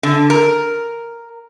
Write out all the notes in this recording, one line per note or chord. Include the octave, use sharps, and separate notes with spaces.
D3
A#4